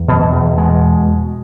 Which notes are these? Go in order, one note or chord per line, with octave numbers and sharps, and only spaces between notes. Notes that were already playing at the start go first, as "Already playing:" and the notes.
Already playing: E2
B2
E2
B2 G#3